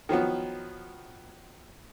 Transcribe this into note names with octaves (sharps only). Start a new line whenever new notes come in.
D#3 F3 F#3 B3